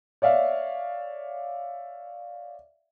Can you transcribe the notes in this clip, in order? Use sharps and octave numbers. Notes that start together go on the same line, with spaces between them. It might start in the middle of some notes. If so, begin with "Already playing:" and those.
C#5 D5 E5 F5